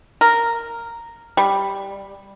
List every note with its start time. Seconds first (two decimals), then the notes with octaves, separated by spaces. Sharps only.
0.21 A#4
1.37 G3